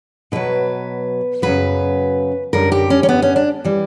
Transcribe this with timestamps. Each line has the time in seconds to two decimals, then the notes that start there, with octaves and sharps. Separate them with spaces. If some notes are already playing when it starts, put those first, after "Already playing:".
0.32 B2 F#3 B4
1.42 F#2 C#3 F#3 B4
2.53 F#2 D3 G3 A#4
2.72 G4
2.90 C#4
3.03 C#4
3.09 B3
3.22 C#4
3.36 D4
3.65 E3 G3